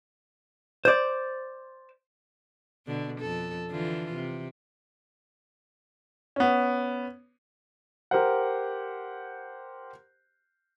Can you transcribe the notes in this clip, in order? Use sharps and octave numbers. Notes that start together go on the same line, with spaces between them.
C5 D5
B2 D3
F2 A4
D3 E3 F4
C3
B3 C#4
G4 A#4 C5 F#5